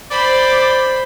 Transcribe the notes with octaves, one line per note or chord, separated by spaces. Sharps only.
C5 D5 B5